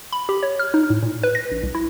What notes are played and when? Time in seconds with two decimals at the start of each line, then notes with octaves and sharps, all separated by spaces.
0.12 B5
0.29 G4
0.43 C#5
0.59 F6
0.74 D#4
0.90 A2
1.03 A#2
1.23 B4
1.35 A#6
1.51 A#1
1.63 C2
1.75 E4